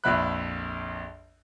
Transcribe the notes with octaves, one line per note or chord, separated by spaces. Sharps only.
A#1 F2 E5 B5 F#6